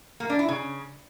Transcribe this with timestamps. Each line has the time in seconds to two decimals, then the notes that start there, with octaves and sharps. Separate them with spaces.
0.20 A#3
0.30 D4
0.39 E4
0.48 C#3